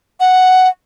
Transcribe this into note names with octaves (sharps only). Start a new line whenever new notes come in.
F#5